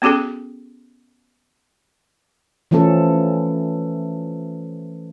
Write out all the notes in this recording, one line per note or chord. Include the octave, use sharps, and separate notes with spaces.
B3 C#4 F#4 G#4 A4
E3 F3 A3 C#4 A4